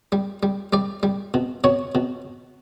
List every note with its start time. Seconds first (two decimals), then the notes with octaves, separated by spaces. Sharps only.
0.12 G3
0.43 G3
0.73 G3 D5
1.03 G3
1.34 B2
1.64 B2 C#5
1.95 B2